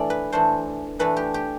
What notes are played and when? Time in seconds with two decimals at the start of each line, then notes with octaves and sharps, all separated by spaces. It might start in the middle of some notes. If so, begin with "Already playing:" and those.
Already playing: E3 A3 D4 D5
0.10 B4
0.32 E3 A3 D4 C5
0.99 E3 A3 D4 B4
1.17 G4
1.34 G4